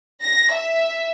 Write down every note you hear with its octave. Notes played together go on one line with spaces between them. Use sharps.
A#6
E5